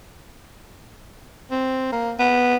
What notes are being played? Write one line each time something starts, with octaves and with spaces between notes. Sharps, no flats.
C4
A#3
B3